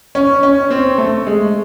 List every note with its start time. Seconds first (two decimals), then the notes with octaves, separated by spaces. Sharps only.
0.15 C#4
0.43 C#4
0.71 C4
0.98 A3
1.27 G#3